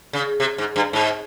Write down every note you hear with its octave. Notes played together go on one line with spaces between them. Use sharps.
C#3
C3
G#2
G2
G#2